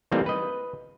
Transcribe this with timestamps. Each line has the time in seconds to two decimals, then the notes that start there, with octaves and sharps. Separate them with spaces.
0.12 E3 G3 A3 A#3 C4 D#4
0.26 B4 D#5